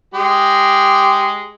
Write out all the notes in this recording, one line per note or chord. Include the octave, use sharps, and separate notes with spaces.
G#3 G4